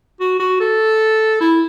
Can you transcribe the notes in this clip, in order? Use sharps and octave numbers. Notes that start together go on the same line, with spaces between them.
F#4
F#4
A4
E4